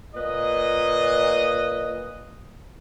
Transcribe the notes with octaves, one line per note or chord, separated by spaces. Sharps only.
A#2 B4 D#5